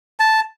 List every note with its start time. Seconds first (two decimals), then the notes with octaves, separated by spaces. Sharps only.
0.20 A5